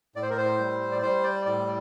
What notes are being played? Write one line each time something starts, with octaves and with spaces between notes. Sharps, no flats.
A2 D5
C5
A#4
C5
G3
D5
G3 C5
D5
A2 D5